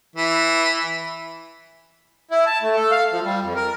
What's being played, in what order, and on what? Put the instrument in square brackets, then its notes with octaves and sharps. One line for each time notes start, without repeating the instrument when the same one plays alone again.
[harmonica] E3
[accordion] E4
A5
A3
A4
F5
F3
G3
F2
A#4